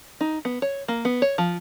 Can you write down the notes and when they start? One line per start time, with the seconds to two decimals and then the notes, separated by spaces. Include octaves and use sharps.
0.21 D#4
0.45 B3
0.62 C#5
0.88 A#3
1.05 B3
1.22 C#5
1.38 F3